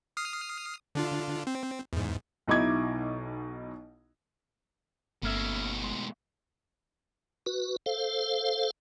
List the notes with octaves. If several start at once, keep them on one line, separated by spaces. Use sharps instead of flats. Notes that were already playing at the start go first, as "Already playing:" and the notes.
D#6 F6 C7
D3 D4 F4
C4
E2 G#2
B1 B2 D#4 E4 D6 G#6
G1 B2 A3 A#3 C#4 E5
G#3
F#4 B4
A4 C5 F5